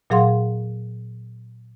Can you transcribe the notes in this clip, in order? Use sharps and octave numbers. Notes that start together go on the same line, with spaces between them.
A#2 F#3 G#4 F5 F#5 C6